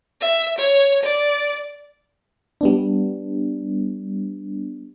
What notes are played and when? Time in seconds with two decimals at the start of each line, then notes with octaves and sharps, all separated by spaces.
0.21 E5
0.58 C#5
1.03 D5
2.61 G3 B3 D4